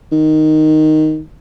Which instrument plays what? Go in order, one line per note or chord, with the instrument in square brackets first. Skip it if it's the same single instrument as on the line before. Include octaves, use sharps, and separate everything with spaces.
[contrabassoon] D#3